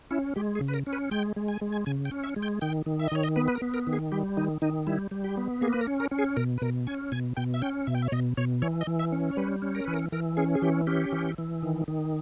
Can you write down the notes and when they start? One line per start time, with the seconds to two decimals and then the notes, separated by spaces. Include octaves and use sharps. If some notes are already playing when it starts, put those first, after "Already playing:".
0.11 C#4 E4
0.36 G#3 G4
0.55 G#4
0.61 C#3
0.68 B4
0.74 A#4
0.87 C#4
0.93 B4
1.11 G#3 G5
1.36 G#3
1.48 G#5
1.61 G#3
1.72 G#5
1.86 C#3 G#5
2.05 G5
2.11 C#4
2.24 E5
2.36 G#3
2.42 G5
2.61 D#3 G5
2.86 D#3
2.99 E5
3.08 D#5
3.12 D#3 C#5
3.23 D#5
3.36 B3 B4
3.48 B4
3.55 A#4
3.62 B3
3.74 A#4
3.87 D#3
3.93 G#4
4.12 G3 G4
4.37 D#3 D#4
4.62 D#3 D#4
4.87 G3 E4
5.11 G3
5.24 G4
5.37 B3
5.61 A#3 G#4
5.73 B4
5.81 A#4
5.87 C#4
6.00 A#4
6.11 C#4
6.19 G#4
6.37 B2 A#4
6.58 B4
6.62 B2 A#4
6.87 C#4 G#5
7.12 B2 G#5
7.37 B2 G5
7.54 E5
7.62 C#4 G5
7.87 B2 E5
7.95 G5
8.02 E5
8.08 C#5
8.12 B2 D#5
8.37 B2 C#5
8.62 E3 C#5
8.81 D#5
8.87 E3
8.99 E5
9.12 C#4
9.31 C#5
9.37 G3 B4
9.62 C#4
9.75 A#4
9.84 E3 B4
9.94 A#4
10.12 E3 A#4
10.37 C#4 G#4
10.55 G#4
10.62 E3 G4
10.87 C#4 G4
11.13 E3
11.38 E3
11.63 D#3
11.88 D#3